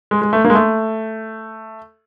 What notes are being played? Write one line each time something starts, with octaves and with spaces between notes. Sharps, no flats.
G#3
G#3
A3
A#3
G#3
A3